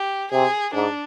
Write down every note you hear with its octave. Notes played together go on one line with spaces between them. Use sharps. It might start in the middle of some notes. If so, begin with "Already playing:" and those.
Already playing: G4
C3 G#4
G#2 D4